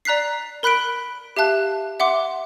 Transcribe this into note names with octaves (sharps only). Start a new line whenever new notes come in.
D5 A#5 F#6 B6 C7
A#4 B5 F#6 B6 D7
G4 E5 F5 A5 F#6
E5 F#5 C6 D6